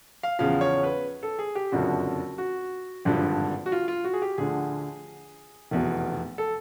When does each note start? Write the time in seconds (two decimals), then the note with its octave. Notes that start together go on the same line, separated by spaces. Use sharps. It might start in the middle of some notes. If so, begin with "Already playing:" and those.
0.23 F5
0.39 E2 C#3 F3 F5
0.61 C#5
0.83 B4
1.23 A4
1.39 G#4
1.55 G4
1.72 F#1 F2 D3 F3 F#4
2.38 F#4
3.05 G#1 G2 D3 F3
3.66 F#4
3.72 F4
3.88 F4
4.04 F#4
4.13 G#4
4.22 G4
4.38 D2 D3 F3 G#4
5.71 F1 E2 B2
6.38 A4